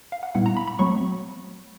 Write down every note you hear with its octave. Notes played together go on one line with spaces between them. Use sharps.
F5
F#5
A#2 G3 B3 E4 F#5
A#5
B5
B5
F#3 A3 C4 C#6